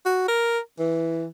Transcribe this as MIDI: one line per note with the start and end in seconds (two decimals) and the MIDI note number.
0.06 0.27 66
0.28 0.59 70
0.79 1.26 52